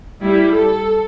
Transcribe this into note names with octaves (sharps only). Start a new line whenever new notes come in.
G3 E4
A4